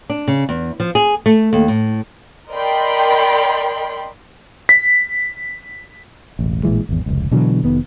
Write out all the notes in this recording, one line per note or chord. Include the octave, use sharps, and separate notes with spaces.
D4
C#3
E2
F3
G#4
A3
D#2
A2
A#4 D5 D#5 G5 B5 C6
B6
E1 A1
A1 A#2 E3 G#3
G#1 E2
F1 C#2
B2 D3 E3 F#3
F1 D#3 B3